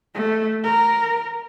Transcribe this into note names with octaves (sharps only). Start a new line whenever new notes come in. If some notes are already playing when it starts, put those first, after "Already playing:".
A3
A#4